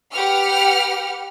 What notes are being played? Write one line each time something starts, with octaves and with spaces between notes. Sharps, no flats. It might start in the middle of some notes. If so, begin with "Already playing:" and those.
G4 B4 F#5 F6